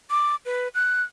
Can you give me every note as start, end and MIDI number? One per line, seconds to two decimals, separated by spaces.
0.10 0.36 86
0.46 0.68 71
0.75 1.03 90